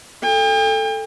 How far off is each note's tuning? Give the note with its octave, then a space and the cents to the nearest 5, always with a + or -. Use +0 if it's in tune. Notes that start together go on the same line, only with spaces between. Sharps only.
A4 +0 G5 +40